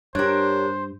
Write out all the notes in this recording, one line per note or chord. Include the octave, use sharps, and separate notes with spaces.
G2 D4 G4 A#4 C5 C#5